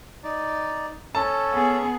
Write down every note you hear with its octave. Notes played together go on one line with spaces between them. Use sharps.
D#4 D5
C#4 A4 A5
B3 G#4